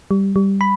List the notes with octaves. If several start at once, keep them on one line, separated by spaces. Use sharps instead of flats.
G3
G3
B5